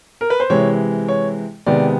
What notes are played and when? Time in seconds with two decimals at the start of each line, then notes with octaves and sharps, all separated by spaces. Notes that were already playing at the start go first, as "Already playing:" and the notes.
0.21 A#4
0.30 B4
0.40 C5
0.50 C3 E3 G#3 C#5
1.08 C#5
1.67 C3 D#3 G#3 B3 D5